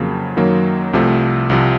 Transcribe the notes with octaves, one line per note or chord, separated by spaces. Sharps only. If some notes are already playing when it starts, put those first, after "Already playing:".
Already playing: F2 C#3 F#3 A#3
F#2 D#3 F#3 A#3
C2 C3 F3 A3
C2 C3 F3